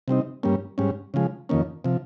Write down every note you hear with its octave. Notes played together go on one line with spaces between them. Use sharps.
C3 G3 C4 D#4
G2 G3 A#3 C#4
G#2 G3 C#4
C#3 F3 G#3
F2 D#3 A#3 C#4
C3 F3